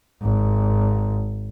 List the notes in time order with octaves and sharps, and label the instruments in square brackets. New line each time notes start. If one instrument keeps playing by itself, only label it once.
[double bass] G#1